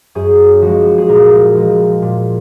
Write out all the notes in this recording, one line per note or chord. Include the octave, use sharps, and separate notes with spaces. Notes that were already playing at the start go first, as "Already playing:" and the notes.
F#2 G#4
F3 G#3 F#4
G#4
A#2 A#4
F3 G#3
A#2